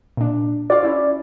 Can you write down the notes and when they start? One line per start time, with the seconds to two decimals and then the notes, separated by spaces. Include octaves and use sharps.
0.17 A#2 D4
0.70 F4 F#4 D5 F5
0.83 C#4 E4